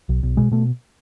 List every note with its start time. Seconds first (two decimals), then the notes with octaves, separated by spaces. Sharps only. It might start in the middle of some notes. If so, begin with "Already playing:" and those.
0.09 B1
0.23 B1
0.37 B2 G#3
0.51 B2 A3